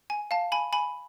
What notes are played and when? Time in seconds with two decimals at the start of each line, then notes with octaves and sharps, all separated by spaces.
0.10 G#5
0.31 F5 A5
0.52 G#5 B5
0.73 G#5 B5